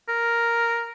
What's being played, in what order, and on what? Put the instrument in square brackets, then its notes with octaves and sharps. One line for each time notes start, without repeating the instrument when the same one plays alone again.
[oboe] A#4